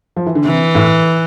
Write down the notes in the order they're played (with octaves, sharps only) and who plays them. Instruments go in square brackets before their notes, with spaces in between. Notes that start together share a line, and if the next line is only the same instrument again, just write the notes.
[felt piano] F3
E3
D3
[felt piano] C3 [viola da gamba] E3
[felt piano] A2